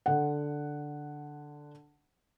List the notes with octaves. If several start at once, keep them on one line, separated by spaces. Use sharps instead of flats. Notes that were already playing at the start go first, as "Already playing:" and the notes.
D3 F#5